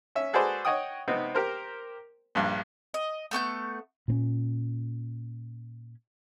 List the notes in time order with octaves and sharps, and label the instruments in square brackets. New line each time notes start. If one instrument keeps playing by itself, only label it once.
[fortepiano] C#4 E5
F#4 G#4 A4 B4 C5 D5
C#5 D#5 F#5 G5 D#6
C3 B3 C4 D#4
G4 A#4 C5
A#1 G2
[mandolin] D#5
A3 B3 C#6 G6
[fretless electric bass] A#2 C4 C#4